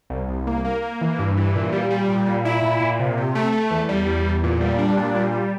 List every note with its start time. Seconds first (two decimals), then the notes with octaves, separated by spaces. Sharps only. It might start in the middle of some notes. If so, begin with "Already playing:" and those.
0.10 C2
0.28 C2
0.47 A#3
0.65 A#3
0.82 A#3
1.01 E3
1.19 G2
1.37 E3
1.55 A#2
1.73 G3
1.90 G3
2.08 A#2
2.27 A#2
2.45 E4
2.62 A#2
2.80 A#2
2.99 C3
3.17 C3
3.35 A3
3.52 A3
3.71 E2
3.89 G3
4.07 E2
4.25 E2
4.43 A#2
4.61 G3
4.78 D4
4.97 A#2
5.15 G3
5.32 G3